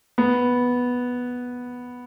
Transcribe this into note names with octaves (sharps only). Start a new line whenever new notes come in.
B3